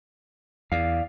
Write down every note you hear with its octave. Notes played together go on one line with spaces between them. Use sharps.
E2 D5 F5